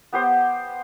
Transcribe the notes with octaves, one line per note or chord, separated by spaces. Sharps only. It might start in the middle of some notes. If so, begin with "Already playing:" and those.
B3 G4 C5